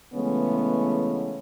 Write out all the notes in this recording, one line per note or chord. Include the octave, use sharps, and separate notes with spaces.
C#3 E3 G#3 A3 B3 C#4